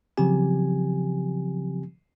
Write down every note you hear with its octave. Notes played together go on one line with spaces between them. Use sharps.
C#3 F3 F#3 C4 G4 G#5